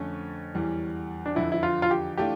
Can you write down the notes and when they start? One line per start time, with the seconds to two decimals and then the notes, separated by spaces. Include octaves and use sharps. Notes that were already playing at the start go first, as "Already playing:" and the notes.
Already playing: F2 D3 A3 C#4
0.54 E2 E3 G3
1.26 D4
1.35 F2 D3 F3 E4
1.52 E4
1.63 F4
1.82 F4
1.91 G4
2.17 E3 A3 D4 F4 G4